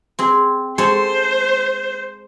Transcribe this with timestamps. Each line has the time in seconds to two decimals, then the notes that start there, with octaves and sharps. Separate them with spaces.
0.19 C4 G#4
0.78 G#3 A4 C5 C#5